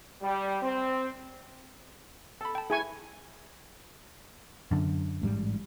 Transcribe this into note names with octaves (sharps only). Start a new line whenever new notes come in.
G3
C4
A4 B5
G5 A5
E4 G#4 G#5 C#6
F#2 D3
A1 G#2 G3